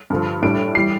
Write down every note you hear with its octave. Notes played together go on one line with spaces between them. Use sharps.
G2 D3 F3
A2 G3 D4 D7
E3 G3 C7